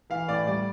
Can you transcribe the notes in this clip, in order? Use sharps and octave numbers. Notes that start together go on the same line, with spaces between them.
E3 F5
A2 D5
G3 D5